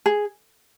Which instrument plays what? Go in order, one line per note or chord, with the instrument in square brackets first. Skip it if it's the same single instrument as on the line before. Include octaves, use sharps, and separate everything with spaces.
[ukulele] G#4